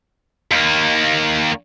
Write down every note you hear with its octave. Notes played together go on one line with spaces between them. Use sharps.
D#2 A#3